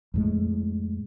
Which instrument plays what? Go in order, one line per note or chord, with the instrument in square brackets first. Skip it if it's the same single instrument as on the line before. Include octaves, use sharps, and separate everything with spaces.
[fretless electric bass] F2 A2 G#3